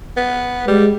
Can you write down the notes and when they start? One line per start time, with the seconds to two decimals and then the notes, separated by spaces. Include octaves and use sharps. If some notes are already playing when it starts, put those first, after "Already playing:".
0.17 B3
0.68 G3 G#3